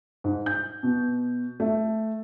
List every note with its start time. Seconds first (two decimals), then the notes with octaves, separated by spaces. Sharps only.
0.24 G#2
0.46 G6
0.83 B2
1.60 A3